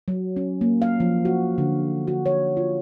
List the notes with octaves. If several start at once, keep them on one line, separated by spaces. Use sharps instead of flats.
F#3
C#4
A#3
F5
F3
F#4
D3
F#4
C#5
F4